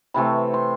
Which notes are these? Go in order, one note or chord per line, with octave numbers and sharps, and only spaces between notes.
C3 E3 A3 C4 B5
C6